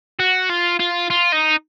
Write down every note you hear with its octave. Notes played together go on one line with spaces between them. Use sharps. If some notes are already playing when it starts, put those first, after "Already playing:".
F#4
F4
F4
F4
D#4